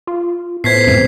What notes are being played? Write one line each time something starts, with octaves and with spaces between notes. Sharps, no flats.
F4
A2 B3 B4 C5 G#6 B6 C7
F2 G#2 C3